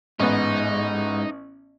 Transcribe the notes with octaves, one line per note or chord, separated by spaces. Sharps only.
A1 G#2 B3 D#4